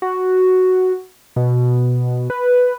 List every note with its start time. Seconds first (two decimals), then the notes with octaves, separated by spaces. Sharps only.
0.02 F#4
1.36 B2
2.30 B4